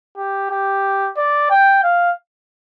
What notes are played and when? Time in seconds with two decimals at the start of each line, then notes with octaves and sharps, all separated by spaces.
0.17 G4
0.51 G4
1.17 D5
1.51 G5
1.84 F5